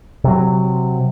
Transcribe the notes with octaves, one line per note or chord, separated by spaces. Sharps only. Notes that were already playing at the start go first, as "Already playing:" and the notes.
C3 F#3